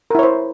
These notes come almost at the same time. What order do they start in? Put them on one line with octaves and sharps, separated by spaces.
A#4 E4 C#5 C5